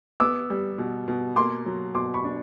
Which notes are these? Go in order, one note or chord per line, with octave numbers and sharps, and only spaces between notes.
B3 D6 E6
G3
B2
B2
A#3 C6 D6
F#3
B2 C6 D6
B5 C#6
D4